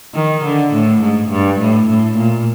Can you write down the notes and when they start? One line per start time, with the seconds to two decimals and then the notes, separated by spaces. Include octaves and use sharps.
0.14 D#3
0.44 D3
0.73 A2
1.02 G#2
1.30 G2
1.60 A2
1.89 A2
2.17 A#2